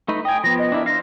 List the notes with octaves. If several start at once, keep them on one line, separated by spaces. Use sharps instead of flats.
A3 D#4 B4
D#5 G5 G#5
F3 B3 A#6
D#5
D4 E4 A#4
C5 F5 A#6